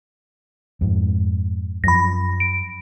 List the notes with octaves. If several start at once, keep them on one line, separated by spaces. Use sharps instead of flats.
F2 G#2
F#2 F3 B5 A#6
D7